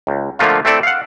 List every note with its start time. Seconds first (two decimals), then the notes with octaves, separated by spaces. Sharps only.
0.07 C#2
0.39 D3 F3 A3 A#3 F4
0.65 A3 C4 E4 A4 D5
0.83 F5 F#5